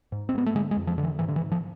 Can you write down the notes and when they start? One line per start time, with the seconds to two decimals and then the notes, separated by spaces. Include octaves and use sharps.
0.12 G#2
0.29 C4
0.34 G#2 B3
0.46 A3
0.55 D3 G#3
0.71 G#3
0.77 F2
0.87 F3
0.98 D3
1.03 E3
1.19 G#2 E3
1.28 D3
1.36 E3
1.41 G#2
1.51 F3